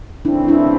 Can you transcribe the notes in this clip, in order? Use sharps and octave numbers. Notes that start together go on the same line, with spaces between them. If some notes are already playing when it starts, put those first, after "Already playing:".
C#3 E3 A3 C4 D4 E4
D4 E4